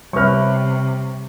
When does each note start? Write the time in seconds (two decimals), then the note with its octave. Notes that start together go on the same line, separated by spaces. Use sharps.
0.13 C3 G3 B4 C#5 E5 C#6 F6